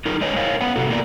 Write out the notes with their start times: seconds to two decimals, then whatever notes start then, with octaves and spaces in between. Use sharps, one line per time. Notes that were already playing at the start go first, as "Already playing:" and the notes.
0.06 D#4 F4 G#4 A#4
0.21 G#3 A#4 B4 C#5 D#5 G#5
0.36 A#4 C5 C#5 F5
0.61 B3 C#4 B4 F#5
0.76 C3 F#4 A4
0.90 A#3 B3 A#4 D5